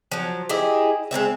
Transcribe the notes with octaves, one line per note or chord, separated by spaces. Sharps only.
F3 F#3
E4 G4 G#4 D#5
G#3 A#3 C4 E5